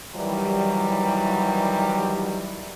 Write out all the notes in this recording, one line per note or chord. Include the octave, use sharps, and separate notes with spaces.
D#3 E3 F#3 G3